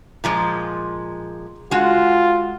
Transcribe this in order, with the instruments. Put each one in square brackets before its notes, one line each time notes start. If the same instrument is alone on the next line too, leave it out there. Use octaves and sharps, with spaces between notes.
[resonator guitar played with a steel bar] A#2 F3 G#3
[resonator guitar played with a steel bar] G#3 F#4 [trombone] F4